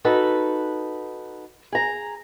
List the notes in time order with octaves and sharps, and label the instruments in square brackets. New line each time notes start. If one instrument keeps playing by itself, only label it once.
[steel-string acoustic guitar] D#4 F#4 A4 B4
G#4 A#5